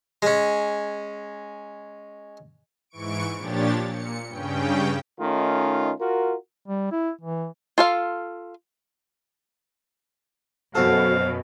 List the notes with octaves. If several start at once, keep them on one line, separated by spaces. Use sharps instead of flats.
G#3 C#4
G#2 E3 C#6 D7
A#2 F3 D4 G4 C#5 A6
A#2 C#7
G2 C#3 C#4 G5
D#3 A3 C#4 D#4 F4
F4 F#4 A#4
G3
E4
E3
F4 A4 F5
F#2 B2 F#4 A4 C5 F5